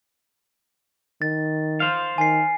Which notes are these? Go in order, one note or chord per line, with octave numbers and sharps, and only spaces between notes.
D#3 A6
C5 F5
D#3 G#5 C7